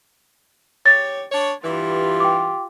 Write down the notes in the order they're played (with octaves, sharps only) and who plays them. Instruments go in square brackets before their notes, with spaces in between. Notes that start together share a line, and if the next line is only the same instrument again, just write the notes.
[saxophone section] G4 C#5 [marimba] A6
[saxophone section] D4 C#5
[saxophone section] G2 E3 [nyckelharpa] F4 G4
[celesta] G5 D6